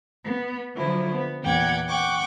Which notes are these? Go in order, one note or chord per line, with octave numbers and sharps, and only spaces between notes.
B3
D3 F3 F#3 E4
B3
E2 A#2 F#5 G5 D6 G#6
F#5 G5 C#6 D6